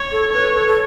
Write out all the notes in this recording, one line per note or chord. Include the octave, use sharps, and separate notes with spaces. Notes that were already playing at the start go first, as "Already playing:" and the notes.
Already playing: C#5
A4
B4 C#5
A4
A4